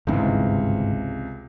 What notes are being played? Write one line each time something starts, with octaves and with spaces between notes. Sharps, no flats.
G1 C#2 G#2 C3 E3